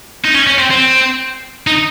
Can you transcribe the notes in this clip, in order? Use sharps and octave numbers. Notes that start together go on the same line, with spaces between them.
D#4
C#4
C#4
C4
C4
D#4